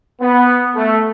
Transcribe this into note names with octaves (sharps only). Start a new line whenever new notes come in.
B3
A3